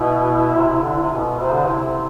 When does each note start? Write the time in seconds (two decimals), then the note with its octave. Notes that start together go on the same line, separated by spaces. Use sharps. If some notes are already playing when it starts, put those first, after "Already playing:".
Already playing: B2 E4
0.55 C3
0.82 D3
1.01 C3
1.12 B2
1.39 C3 C5
1.53 D3
1.66 C3 E4
1.82 C3